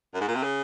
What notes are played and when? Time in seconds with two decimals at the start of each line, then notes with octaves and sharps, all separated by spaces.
0.14 F#2
0.21 G#2
0.28 A#2
0.35 C3
0.42 C#3